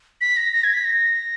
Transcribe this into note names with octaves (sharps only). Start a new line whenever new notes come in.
B6
A#6
A#6
G#6
B6
A#6